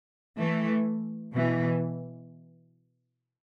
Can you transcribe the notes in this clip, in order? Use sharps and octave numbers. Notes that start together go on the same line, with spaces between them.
E3 A3
B2 E3